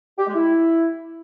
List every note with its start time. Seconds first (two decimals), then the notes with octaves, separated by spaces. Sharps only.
0.19 G4
0.27 G#3
0.35 E4